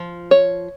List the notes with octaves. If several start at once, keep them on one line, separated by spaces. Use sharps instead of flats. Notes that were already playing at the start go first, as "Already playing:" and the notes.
Already playing: F3
C#5